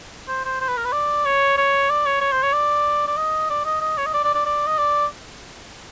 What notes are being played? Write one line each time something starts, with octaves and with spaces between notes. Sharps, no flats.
C5
C5
C5
B4
A#4
B4
D5
C#5
C#5
D5
C#5
C#5
C5
C#5
D5
D5
D#5
D5
D#5
D#5
C#5
D#5
D5
D5
D5
D5
D#5
D5